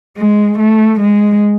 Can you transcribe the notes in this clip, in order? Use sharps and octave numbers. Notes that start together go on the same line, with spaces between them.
G#3
A3
G#3